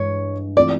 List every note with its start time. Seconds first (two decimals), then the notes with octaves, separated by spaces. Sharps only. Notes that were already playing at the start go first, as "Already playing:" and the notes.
Already playing: G2 E3 G#3 C#5
0.56 E3 A3 C4 F4 D5